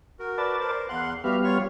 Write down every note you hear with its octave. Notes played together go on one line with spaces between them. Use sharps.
F#4 A#4
B4 D5 A5
A#4 C5
E2 F5 F#5 C6
G3 B3 F#4 G4 E5 F5
F4 C#5 C#6